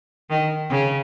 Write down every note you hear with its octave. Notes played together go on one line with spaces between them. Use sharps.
D#3
C#3